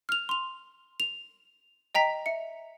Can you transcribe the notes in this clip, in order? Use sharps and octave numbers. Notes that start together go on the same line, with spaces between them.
F6 F7
C6 F7
F7
D#5 G5 A#5 B6
E5 C#7